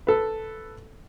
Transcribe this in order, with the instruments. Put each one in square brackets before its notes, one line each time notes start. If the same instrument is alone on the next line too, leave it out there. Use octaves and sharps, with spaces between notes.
[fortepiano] A4 B4